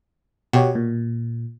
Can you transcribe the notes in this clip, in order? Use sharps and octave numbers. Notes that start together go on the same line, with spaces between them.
B2 F#4 G4 C#5
A#2